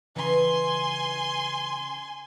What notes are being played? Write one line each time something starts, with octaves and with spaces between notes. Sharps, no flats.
C#3 E3 B4 G#5 C6